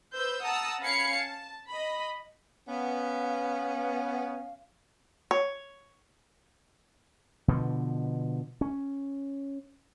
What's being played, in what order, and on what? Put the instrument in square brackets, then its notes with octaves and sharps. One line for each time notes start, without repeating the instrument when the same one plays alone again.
[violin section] B4 C5 E6 G6
F#5 A5 A#5 D#6 E6
C#4 F5 B5 G#6 C7 C#7
A5
D#5 B5
[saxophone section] B3 [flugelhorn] C#4 [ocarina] F5
[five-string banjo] C#5
[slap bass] B2 D3 F3
C#4